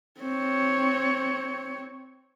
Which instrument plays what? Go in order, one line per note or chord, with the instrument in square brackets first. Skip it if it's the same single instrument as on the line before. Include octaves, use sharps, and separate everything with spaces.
[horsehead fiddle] C4 C#5